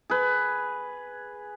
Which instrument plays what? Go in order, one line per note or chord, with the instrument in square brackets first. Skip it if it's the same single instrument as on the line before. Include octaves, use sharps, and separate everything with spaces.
[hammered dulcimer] G#4 B4